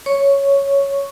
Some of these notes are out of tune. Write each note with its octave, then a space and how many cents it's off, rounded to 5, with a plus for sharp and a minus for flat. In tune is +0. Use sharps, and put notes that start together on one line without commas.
C#5 +0 C#6 +0